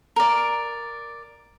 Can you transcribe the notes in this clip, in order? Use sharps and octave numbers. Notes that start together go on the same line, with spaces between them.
A#4 D5